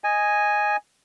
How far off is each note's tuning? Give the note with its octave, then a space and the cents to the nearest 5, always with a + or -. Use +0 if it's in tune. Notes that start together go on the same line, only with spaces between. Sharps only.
D#5 +0 G#5 +0